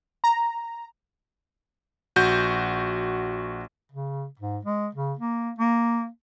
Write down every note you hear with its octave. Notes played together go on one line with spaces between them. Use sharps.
A#5
A#1 F#4 G6
C#3
G#2
G#3
C#3
A#3
A#3